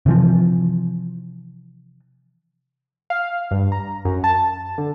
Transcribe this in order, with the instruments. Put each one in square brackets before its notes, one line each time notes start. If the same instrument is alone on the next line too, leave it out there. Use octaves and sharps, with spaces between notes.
[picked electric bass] C3 E3 F3
[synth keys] F5
G2
A#5
F#2
A5
D3